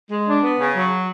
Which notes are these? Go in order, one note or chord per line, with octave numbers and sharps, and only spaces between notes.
G#3
D4
B3
C#3
F#3